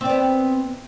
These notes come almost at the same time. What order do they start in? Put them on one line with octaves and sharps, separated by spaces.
C4 D5 B3